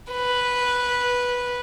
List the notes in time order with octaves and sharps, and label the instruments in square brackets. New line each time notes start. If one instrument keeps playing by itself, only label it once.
[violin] B4